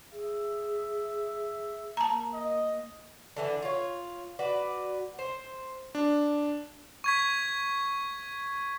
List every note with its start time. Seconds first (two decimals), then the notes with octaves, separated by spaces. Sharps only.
0.13 G#4 E5
1.97 A#3 A5 A#5
2.34 D#5
3.36 D3 E3 D4
3.63 F4 C#5
4.39 F#4 B4 D5
5.19 C5
5.95 D4
7.04 C#6 G#6 B6